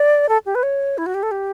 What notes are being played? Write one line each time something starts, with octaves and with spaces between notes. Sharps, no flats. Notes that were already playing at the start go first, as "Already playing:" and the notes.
Already playing: D5
A4
G4
B4
C#5
E4
F#4
G4
A4
G4